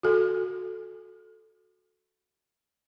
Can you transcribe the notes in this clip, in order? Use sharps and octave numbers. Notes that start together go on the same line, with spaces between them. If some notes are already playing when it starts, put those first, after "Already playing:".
F#4 A4